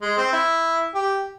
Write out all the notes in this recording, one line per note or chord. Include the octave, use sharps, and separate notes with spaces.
G#3
C4
E4
G4